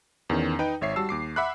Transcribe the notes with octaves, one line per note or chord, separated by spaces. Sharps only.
E2 D#3 C#4
D#4 B4 G5
G#1 C#5 E5 C7
G3 F#4 A5 E6
D#2 D6 C7
E5 F#5 B5 D6 F#6